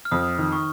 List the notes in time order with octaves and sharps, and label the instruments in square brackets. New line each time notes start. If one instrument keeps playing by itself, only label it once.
[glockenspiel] F6
[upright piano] F2 [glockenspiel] D#6
[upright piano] D#3
[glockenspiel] C#6